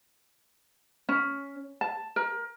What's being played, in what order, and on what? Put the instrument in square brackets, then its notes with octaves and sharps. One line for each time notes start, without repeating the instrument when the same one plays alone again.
[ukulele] C#4
A5
A#4